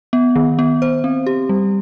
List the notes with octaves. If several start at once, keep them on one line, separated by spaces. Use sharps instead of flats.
B3
D#3
B3
C5
C4
G4
G3